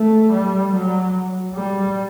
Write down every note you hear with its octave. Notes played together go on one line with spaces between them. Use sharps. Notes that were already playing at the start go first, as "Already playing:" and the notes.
Already playing: A3
G3
F#3
G3